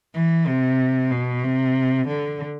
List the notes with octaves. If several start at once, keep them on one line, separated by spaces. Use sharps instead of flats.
E3
C3
B2
C3
D3